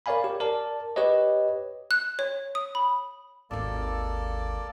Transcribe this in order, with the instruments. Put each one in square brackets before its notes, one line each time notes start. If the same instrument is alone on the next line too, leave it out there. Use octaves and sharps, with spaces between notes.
[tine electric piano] A#4 C#5 D5 F5 G#5 B5
G4
A#4 D5 A5
G4 B4 C#5 D#5
[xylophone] F#6
C#5
D#6
B5
[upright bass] G#1 D#2 [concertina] A#3 A4 D5